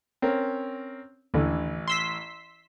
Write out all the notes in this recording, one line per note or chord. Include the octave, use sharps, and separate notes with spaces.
C4 C#4 A#4
A1 D#2 D3 E3
C6 E6 B6